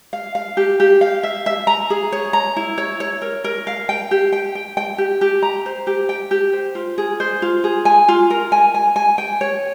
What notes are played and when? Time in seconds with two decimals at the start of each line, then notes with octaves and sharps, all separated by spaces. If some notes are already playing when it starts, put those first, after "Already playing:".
0.13 F5
0.35 F5
0.57 G4
0.80 G4
1.01 F5
1.23 E5
1.46 E5
1.67 A#5
1.90 G#4
2.12 C#5
2.33 A#5
2.56 E4
2.78 C#5
3.00 C#5
3.22 A#4
3.44 A#4
3.67 F5
3.89 G5
4.11 G4
4.33 G5
4.55 G5
4.77 G5
4.98 G4
5.21 G4
5.43 A#5
5.66 C5
5.87 G4
6.09 G5
6.31 G4
6.53 C5
6.75 F4
6.98 G#4
7.20 C5
7.42 F4
7.64 G#4
7.85 G#5
8.08 F4
8.30 A#4
8.52 G#5
8.74 G#5
8.96 G#5
9.18 G5
9.41 C#5